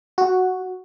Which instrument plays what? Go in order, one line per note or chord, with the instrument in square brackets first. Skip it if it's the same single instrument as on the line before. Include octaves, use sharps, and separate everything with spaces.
[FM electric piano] F#4